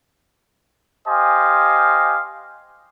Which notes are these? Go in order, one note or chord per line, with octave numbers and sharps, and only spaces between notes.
G4 C5 D#5 F5 G#5